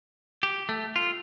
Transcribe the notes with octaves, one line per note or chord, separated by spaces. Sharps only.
G4
A3
F4